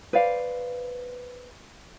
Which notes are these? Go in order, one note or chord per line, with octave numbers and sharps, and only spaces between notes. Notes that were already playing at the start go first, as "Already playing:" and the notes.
B4 C5 D5 F5